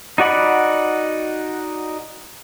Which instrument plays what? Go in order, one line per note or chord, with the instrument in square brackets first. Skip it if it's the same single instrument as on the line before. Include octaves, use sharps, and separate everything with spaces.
[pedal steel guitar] D#4 F#4 D5 F#5 B5